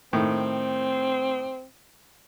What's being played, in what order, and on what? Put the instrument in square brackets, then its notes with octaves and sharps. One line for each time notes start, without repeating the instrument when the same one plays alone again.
[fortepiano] A2 D#3 [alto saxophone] C4